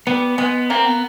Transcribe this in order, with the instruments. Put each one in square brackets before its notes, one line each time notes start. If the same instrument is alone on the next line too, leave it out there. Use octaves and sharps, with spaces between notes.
[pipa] G3 [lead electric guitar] B3
[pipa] G#3 [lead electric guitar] B3
[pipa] A#3 [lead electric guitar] C4
[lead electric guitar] B3